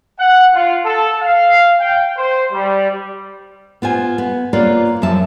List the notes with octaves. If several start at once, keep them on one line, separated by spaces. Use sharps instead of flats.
F#5
F4
A4
F5
G5
C5
G3
B3 F4 C5 G#5
B3
A#3 F4 B4 C#5 D5
F#2 F3 E5 A5